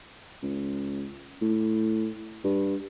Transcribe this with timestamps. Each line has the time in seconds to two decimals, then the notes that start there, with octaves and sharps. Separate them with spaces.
0.43 C#2
1.41 A2
2.45 G2